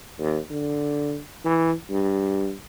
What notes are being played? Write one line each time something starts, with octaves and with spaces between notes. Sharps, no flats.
D#2
D3
E3
G2